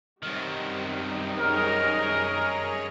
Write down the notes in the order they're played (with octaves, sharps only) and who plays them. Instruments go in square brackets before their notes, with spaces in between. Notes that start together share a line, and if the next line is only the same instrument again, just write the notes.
[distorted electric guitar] F#2 D#3 [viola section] G3 C4 D#4
[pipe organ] G#4 C#5 D#5 [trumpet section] A#4